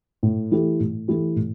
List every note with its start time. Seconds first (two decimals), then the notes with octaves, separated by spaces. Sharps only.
0.23 A2
0.51 E3 A3 E4 G4
0.80 A2
1.08 E3 A3 E4 G4
1.36 A2